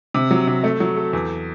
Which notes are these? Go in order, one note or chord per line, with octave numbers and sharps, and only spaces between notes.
C3
F#3
C3
A3
F#3
A4
E2